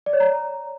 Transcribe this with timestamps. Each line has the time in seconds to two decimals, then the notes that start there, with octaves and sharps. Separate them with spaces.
0.06 D5
0.13 C#5
0.20 A#5